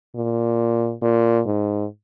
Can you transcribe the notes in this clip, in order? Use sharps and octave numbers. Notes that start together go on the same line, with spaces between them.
A#2
A#2
G#2